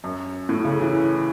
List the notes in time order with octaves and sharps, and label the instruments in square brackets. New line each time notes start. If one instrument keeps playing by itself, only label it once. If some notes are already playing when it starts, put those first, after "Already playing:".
[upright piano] F#2
A2
C#3
E3